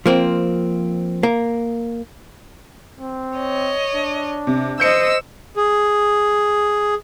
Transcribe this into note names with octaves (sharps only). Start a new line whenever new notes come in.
F3 A#3 C4
A#3
C4
C#5 D#5
D4
C3
C5 D#5 E6 G6 C#7
G#4